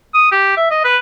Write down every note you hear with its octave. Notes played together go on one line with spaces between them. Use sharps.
D#6
G4
E5
D#5
B4